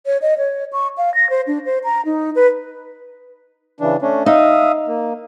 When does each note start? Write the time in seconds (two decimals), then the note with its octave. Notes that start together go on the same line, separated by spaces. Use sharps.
0.06 C#5
0.22 D#5
0.38 C#5
0.73 C#6
0.97 F5
1.15 A#6
1.30 C5
1.47 D4
1.65 C5
1.84 A#5
2.05 D#4
2.35 B4
3.80 C#3 E3 D4
4.02 A3 C#4 D4
4.26 D#4 E5 F5 D#6
4.88 A#3